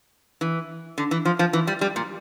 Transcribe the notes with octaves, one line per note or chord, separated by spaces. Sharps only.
E3
D3
E3
F3
F3
E3
G3
G3
A#2